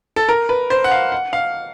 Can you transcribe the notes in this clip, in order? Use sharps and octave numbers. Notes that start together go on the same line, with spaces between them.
A4
A#4
B4
C5
F#5
F5
F#5
F5